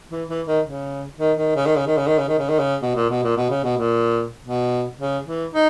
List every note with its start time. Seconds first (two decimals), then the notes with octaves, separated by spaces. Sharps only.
0.11 E3
0.29 E3
0.47 D#3
0.65 C#3
1.19 D#3
1.37 D#3
1.55 C#3
1.66 D#3
1.76 C#3
1.87 D#3
1.97 C#3
2.07 D#3
2.18 C#3
2.28 D#3
2.38 C#3
2.49 D#3
2.59 C#3
2.82 B2
2.95 A#2
3.09 B2
3.23 A#2
3.37 B2
3.50 C#3
3.64 B2
3.77 A#2
4.45 B2
4.99 C#3
5.26 E3
5.54 D#4